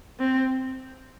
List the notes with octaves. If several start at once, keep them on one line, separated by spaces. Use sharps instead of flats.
C4